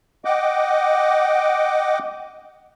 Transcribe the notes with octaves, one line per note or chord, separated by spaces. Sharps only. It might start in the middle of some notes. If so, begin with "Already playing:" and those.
D#5 F#5 G5 D6